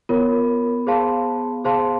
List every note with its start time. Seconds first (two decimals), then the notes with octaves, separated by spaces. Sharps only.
0.09 B3 F4 A#4 C#5
0.87 G#4 C5 F5 A5 C6
1.64 G#4 C5 F5 A5 C6